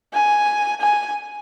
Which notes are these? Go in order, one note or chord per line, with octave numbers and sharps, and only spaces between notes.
G#5
G#5